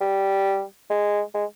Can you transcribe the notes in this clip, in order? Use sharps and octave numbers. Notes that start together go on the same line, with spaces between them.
G3
G#3
G#3